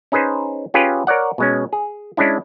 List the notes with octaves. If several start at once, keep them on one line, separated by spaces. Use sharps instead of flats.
C#4 D#4 G#4 B4 C5
C#4 F4 G4 G#4 B4
A#4 C#5 D5 F#5
B2 G#3 C#4
G#4
G#3 C#4 D4 E4